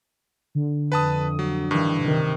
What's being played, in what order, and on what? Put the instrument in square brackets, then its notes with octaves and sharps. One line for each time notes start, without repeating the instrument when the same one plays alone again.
[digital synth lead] D3
[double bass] F2 [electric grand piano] B4 A5 D#6
[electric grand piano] F#3
[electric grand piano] G2 [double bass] D#3 E3
[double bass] C3 D#3